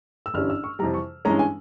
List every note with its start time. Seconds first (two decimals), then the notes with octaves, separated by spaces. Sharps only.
0.26 E6
0.34 G1 G2 E3 G3 C#4 F6
0.50 E6
0.64 C#6
0.79 F2 C3 E3 G3 A#5
0.94 C#6
1.25 G2 E3 G#3 C#4 A#5
1.39 G#5